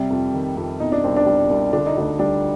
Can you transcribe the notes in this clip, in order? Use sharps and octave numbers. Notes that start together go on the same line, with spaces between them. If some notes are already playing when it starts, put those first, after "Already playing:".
Already playing: C3 G3
F2
D#3
F2
B2 D#4
D4
C2 C4
D4
G3
C2
D3 D4
D#4
D2 D4
G3 D4